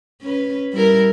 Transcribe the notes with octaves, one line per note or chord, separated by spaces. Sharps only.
C#4 B4
G3 E4 A#4